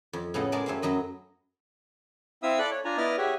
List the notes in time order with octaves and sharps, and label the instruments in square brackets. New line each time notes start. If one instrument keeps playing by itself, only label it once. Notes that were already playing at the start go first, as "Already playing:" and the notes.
[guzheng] F2
A2 C#3 B3 A4 D#5 F#5
G#3 A#4 D5 G#5 A5
F#2 A3 C4 C#4 F5
F#2 F#3 D#5 B5
[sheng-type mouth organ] C4 E4 E5 F5 D#6 E6
A4 D5 B5 F#6
C#5
D4 F4 G#5 A#5
B3 E4 D5 D#5 D#6 F6
G4 G#4 C#5 E5 F#5 G#5